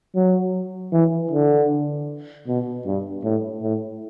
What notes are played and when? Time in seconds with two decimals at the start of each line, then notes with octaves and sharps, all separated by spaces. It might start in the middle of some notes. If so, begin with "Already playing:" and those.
0.15 F#3
0.92 E3
1.31 D3
2.47 B2
2.86 G2
3.24 A2
3.62 A2